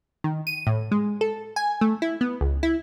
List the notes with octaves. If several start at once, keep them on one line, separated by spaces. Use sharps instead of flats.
D#3
D#7
A2
G#3
A4
G#5
A3
E4
B3
C#2
E4